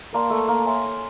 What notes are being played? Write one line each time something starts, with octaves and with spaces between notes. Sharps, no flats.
A#3 A#4 D5 F5 A5 C6
A3
A#3
C#5 E5 G#5 C6